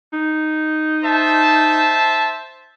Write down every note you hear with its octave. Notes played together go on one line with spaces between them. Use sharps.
D#4
C5 E5 A5